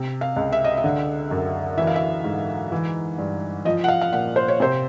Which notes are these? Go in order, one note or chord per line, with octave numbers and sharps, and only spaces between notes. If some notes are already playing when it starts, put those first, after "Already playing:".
Already playing: C3
F5
C#2
E5
D#5
E5
D3
F#2
E3 E5
F5
E5
G#2
E3
G2
F3 D#5
F#5
F5
F5
A#2 F#5
C5
C#5
C3 C5